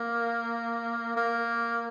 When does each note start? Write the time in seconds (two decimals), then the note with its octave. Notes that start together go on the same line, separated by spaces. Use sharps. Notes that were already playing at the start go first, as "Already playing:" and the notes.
Already playing: A#3
1.17 A#3